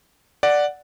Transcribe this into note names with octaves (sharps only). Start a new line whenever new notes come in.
D5 F#5